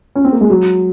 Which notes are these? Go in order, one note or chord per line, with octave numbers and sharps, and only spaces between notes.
C#4
C4
A#3
G#3
F#3